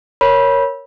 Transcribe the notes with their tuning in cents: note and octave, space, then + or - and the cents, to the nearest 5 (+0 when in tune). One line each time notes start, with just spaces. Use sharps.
A#4 +0 C#5 +0 B5 -20